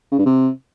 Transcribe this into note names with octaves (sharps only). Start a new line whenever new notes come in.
C#3
G2
C3